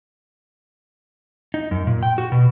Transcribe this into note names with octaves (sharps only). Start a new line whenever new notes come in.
D#4
F#2
A#2
G5
F#4
B2